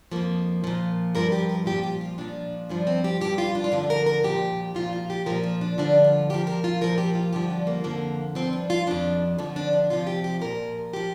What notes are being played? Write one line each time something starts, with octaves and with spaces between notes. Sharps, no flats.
F2 F3 A#3
A#2 F3
G2 F3 A#4
G4
A#4
A#2 F3 G4
G4
F4
A#2 F3 D4
G2 F3 D4
C4
G4
G2 F3 G4
F4
D4
F4
G2 D3 F3 D4
A#4
A#4
A#2 F3 G4
A#2 F3 F4
F4
G4
A#2 F3 A#4
F4
D4
G2 D3 F3 D4
F4
A#2 F3 G4
A#4
F4
A#2 F3 A#4
G4
F4
G2 D3 F3 G4
D4
A#3
F2 D3 F3 A#3
G2 F3 C4
D4
F4
F2 F3 D4
F2 D3 F3
D4
D4
F2 C3 F3 F4
G4
G4
A#2 F3 A#4
F3 G4